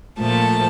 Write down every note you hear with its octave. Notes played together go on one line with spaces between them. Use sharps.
A#2 F3 A3 A5